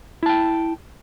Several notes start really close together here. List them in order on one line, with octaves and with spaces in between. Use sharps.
E4 A5 G5